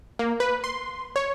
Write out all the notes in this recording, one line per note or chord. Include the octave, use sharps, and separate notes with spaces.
A#3
B4
C6
C#5